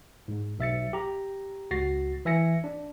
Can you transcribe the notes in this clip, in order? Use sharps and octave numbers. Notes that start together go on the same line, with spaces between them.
G#2
B1 E5 A6 C#7
G4 A#5
C#2 F#4 A6 A#6 C7
E3 E5 G#5 A#6 C#7
D4